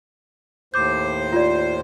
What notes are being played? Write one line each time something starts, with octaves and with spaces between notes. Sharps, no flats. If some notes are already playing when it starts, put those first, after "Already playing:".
D#2 A2 C5 D6 G6
F4 D5